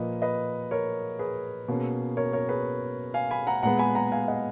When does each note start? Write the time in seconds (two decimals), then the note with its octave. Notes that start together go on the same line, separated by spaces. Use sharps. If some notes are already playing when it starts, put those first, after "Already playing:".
Already playing: A#2 F3 A#3 B4 D#5
0.22 B4 D#5
0.71 A#4 C#5
1.19 G#4 B4
1.68 B2 A#3 C#4
2.17 A#4 C#5
2.33 A#4 C#5
2.49 G#4 B4
3.14 F5 G#5
3.31 G#5 B5
3.47 F#5 A#5
3.63 A#2 G#3 B3 F#5 A#5
3.79 G#5 B5
3.95 F#5 A#5
4.12 F5 G#5
4.28 D#5 F#5